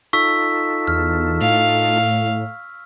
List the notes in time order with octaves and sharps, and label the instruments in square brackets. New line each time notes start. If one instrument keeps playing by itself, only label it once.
[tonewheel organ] D#4 F4 A4 [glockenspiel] C#6 E6 B6
[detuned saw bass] E2 [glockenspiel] F6
[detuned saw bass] A2 [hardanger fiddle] F5